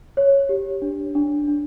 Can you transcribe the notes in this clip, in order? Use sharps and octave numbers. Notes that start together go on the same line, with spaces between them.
C#5
G4
D4
D4
D4